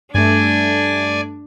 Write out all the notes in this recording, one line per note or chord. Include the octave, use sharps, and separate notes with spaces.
G2 A3 D4 D5 G#5